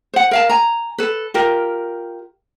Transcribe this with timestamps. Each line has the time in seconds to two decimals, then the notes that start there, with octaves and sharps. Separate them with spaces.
0.14 C5 F#5
0.31 A#4 F5 A5
0.49 G#5 A#5
0.98 A4 B4
1.34 F4 G4 A#4